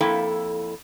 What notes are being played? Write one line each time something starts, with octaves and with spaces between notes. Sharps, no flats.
F2 A#3 E4 A4 G5